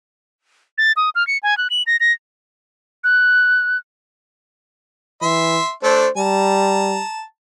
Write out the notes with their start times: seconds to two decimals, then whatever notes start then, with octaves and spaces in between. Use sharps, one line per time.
0.78 A6
0.97 D#6
1.15 F6
1.27 C#7
1.43 G#5
1.58 F#6
1.70 F#7
1.87 A#6
2.00 A#6
3.04 F#6
5.22 E3 E5 C6
5.83 A3 D4 A4 C5
6.17 G3 A5 A#5